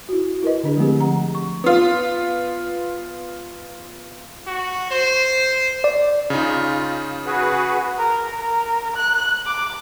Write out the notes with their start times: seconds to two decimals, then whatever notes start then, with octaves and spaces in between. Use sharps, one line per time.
0.09 E4 F#4
0.43 E4 A#4 B4 D#5
0.63 D3 D4 G#4
0.77 F3 G#3 A3 C4 G4
1.01 F#5 A#5
1.35 C#6
1.64 B3 F4
4.47 F#4
4.91 C5
5.84 D5
6.30 C#3 D#4 F4
7.26 F#4 G#4 B4
7.98 A#4
8.40 A#4
8.96 F#6
9.46 D6